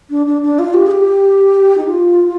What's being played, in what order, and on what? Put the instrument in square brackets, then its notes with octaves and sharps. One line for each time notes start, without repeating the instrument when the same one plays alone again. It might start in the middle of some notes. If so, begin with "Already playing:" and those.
[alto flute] D4
D4
D4
F4
G4
G#4
G4
D#4
F4